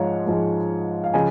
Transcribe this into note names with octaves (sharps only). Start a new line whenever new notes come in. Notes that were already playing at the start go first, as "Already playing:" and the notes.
Already playing: G#2 F3 G#3 C#5 F5
G#2 F3 G#3
F5
C#3 F3 D#5 G#5